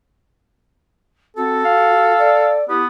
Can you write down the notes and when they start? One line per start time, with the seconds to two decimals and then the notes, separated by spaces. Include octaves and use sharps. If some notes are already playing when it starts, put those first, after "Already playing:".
1.37 C4 F#4 A4
1.65 F5
2.19 D5
2.69 B3 E4 G4